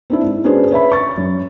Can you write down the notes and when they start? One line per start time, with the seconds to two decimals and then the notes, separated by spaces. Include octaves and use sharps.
0.10 C4 D4 E4
0.23 G#2
0.44 C#4 D4 F#4 G#4 B4 C5
0.71 B4 C#5 E5 B5
0.92 C#6 A6
1.18 F#2